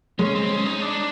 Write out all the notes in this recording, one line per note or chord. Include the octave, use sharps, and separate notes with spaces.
G#3 C#4
C4
C#4
D#4
D4